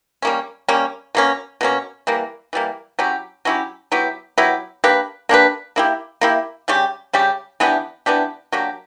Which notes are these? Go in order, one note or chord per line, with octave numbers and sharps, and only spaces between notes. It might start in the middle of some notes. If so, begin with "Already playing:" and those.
G3 A#3 C#4
G3 A#3 C#4
B2 A#3 C#4
B2 A#3 C#4
E3 G3 A#3
E3 G3 A#3
F#3 C#4 E4 G4
F#3 C#4 E4 G4
F#3 B3 E4 G4
F#3 B3 E4 G4
A#3 D4 G4 B4
A#3 D4 G4 B4
A#3 E4 G4
A#3 E4 G4
C#3 G3 C#4 G4
C#3 G3 C#4 G4
E3 B3 D4 G4
E3 B3 D4 G4
F#3 A#3 D4 G4